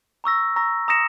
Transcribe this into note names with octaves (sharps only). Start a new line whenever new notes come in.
A#5 C#6 E6 A#6
A#5 C#6 E6 A#6
A#5 D#6 A#6 C#7 E7